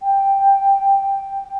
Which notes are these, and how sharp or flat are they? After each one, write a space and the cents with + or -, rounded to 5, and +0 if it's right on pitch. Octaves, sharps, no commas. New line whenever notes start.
G5 +5